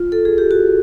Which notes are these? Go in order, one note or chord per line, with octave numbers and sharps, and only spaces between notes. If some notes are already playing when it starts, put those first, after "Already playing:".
Already playing: F4
A4
G#4
G4
F#4